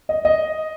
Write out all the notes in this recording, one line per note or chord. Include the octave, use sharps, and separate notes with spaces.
D#5
D#5